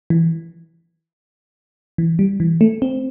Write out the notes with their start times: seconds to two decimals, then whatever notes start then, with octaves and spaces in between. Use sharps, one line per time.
0.10 E3
1.98 E3
2.19 G3
2.40 E3
2.61 A3
2.82 C4